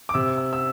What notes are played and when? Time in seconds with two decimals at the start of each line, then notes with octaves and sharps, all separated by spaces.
0.09 D6
0.14 C3 E6
0.38 E6
0.53 E6